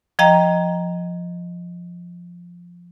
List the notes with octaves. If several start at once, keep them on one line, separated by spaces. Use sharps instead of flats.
F3 D#5 F5 G5 A#5